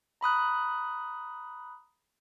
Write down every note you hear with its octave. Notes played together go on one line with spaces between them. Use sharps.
A#5 B5 D#6 F#6